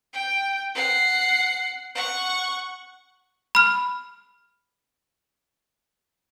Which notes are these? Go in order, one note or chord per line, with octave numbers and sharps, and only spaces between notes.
G5
F#5 C7
F#5 C#6
B5 F6